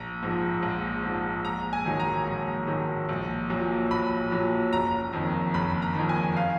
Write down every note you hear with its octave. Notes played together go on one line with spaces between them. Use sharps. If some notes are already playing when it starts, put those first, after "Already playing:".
Already playing: A#1 A#5
G#2 F3
A#1
G#2 F3
A#1 A#5
G#5
G#2 D#3 F#3
A#5
A#1
G#2 D#3 F#3
A#1
A#2 F#3
A#1 B5
A#2 F#3
F#1 A#5
F2 D#3
F#1 B5
A#5
F2 D#3
G#5
F5